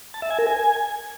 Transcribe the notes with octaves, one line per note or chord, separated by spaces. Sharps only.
A5
E5
G#5
A#4
G#5